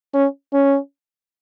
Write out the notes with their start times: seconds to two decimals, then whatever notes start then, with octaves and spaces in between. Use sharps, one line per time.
0.14 C#4
0.53 C#4